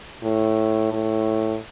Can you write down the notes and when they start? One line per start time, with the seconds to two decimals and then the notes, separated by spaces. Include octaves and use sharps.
0.24 A2
0.92 A2